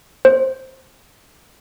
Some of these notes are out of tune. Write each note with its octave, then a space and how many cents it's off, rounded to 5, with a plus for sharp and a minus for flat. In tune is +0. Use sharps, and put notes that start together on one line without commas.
C5 +15